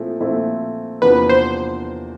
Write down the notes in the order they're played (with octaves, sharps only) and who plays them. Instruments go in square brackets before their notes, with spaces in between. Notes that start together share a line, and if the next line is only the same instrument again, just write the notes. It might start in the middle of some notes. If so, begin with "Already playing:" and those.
Already playing: [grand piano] A#2 F3 A3 C4 E4
A#2 F3 A3 C4 E4
[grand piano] E2 C3 F3 A#3 D4 [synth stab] B4
[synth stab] C5